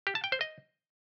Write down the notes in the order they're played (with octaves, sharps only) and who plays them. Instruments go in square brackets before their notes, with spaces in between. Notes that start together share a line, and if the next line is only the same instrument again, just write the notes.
[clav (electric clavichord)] G4
A5
G5
C5
D#5